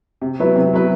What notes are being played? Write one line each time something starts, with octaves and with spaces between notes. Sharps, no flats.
C3
F#3 B3 E4 B4
C3
F#3 B3 E4 B4